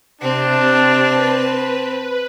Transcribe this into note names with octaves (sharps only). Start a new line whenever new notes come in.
C3 C4 D4 A5
B4